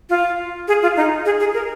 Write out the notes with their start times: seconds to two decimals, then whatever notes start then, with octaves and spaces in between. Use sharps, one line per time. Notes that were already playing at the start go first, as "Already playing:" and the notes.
0.10 F4
0.68 G#4
0.82 F4
0.97 D#4
1.25 G#4
1.40 G#4
1.54 A#4